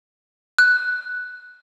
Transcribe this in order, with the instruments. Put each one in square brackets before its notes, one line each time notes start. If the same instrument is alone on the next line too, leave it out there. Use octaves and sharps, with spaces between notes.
[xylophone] F#6